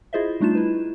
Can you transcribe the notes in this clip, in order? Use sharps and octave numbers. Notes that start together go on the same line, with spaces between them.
E4 F4 G#4 C5 D#5 E5
G3 A3 D4 D#4 F4 E7
E4 B4